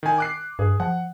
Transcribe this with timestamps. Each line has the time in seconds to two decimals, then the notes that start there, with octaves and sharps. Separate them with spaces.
0.03 D#3 G#5
0.18 D6 F#6 C7
0.59 G2 G#4
0.80 F3 F#5